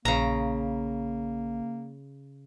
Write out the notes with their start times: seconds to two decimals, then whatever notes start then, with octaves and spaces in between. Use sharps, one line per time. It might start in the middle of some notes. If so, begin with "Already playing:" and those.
0.05 A#1 C#3 A#3 A#5